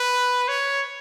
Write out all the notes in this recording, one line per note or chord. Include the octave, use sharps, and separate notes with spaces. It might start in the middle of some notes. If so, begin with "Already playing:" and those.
Already playing: B4
C#5